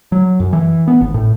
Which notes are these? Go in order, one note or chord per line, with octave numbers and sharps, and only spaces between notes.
F#3
F#2
E3
B3
G#1
A2